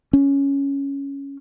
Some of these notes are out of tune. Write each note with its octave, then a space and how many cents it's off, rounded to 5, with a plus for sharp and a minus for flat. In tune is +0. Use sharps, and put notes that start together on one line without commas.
C#4 +5